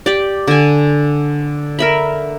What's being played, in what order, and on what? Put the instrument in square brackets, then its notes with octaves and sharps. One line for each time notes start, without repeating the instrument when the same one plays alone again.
[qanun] G4 D5
D3 G#5
A#4 E5 B5